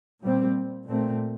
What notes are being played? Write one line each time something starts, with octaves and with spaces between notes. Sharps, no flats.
A#2 G3 C4
A#2 A3 C4